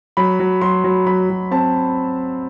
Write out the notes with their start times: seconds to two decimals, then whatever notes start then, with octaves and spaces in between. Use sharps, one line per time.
0.17 F#3 B5
0.40 F#3
0.61 F#3 C6
0.84 F#3
1.06 F#3 B5
1.30 F#3
1.51 C4 A5